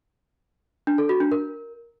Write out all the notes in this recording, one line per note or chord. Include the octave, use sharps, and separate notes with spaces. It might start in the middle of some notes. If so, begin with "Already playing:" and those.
D4
A4
F#4
D4
A#4